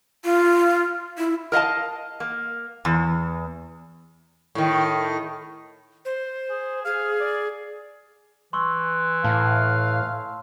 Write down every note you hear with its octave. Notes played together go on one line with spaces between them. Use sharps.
F4
E4
A#4 D#5 F5 A5
A#3
E2
A2 D#3
C5
G#4
G#4 F5
D5
E3 C6 C#6 E6
A2 F5 A5